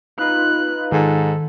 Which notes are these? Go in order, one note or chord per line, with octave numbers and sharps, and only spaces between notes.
D#4 F4 B4 F#6
G#2 D#3 A4